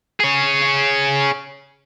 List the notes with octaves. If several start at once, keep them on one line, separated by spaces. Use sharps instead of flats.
G#4 C#5